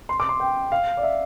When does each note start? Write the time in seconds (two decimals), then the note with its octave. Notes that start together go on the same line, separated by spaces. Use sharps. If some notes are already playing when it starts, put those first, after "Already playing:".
0.09 C6
0.20 D6
0.29 C6
0.40 G5
0.72 F5
0.97 D5
1.03 E5